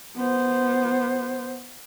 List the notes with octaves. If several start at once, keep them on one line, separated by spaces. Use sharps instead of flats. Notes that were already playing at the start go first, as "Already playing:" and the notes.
B3 C5